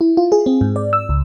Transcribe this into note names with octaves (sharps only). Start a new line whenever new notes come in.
E4
F4
G#4
C4
G#2
D5
E6
C#2